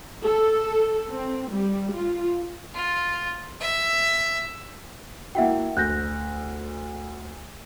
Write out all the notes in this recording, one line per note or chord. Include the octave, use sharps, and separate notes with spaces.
A4
C4
G3
F4
F4
E5
A#3 E4 F#4 E5 F#5 G5
D2 F#6 G6 A#6